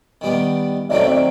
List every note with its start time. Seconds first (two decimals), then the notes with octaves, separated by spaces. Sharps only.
0.21 D#3 G3 B3
0.89 D#3 F#3 A3 C4 D5 E5
1.06 D5 E5